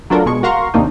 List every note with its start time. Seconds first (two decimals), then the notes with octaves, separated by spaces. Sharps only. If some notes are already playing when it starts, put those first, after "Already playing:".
0.10 F#3 A3 D4 F4 A4 A#4
0.26 B2 G#3 C#6
0.43 F#4 A#4 F5 A#5 C6 C#6
0.74 D#2 C3 D#3 A#3 D4 D#4